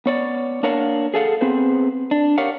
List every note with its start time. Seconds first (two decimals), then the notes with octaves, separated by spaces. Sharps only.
0.06 B3 C#5 D5
0.63 A#3 D4 A#4 C#5 F5 F#5
1.14 G#4 A4 F5 F#5
1.41 B3 C4 G#4 B4 C5
2.11 D4
2.38 G4 A#4 C#5 F5 F#5